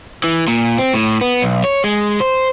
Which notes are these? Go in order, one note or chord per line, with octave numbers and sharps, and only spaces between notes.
E3
A#2
C4
A2
B3
B1
C#5
G#3
C5